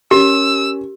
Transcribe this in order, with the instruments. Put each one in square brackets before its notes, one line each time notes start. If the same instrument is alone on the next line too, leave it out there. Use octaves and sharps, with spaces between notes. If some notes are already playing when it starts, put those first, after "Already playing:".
[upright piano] C#4 A#4 [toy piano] G4 [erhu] E6